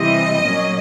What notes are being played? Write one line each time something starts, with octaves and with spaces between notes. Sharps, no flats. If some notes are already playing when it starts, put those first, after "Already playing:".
Already playing: C3 E3 G3 C4 D#5
A#2 F#3 A#3 C#4